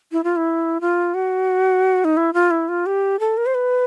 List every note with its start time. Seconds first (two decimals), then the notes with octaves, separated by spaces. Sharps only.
0.12 E4
0.24 F4
0.36 E4
0.81 F4
1.14 F#4
2.05 D#4
2.17 E4
2.34 F4
2.51 E4
2.69 F4
2.86 G4
3.20 A4
3.37 A#4
3.46 C5
3.55 B4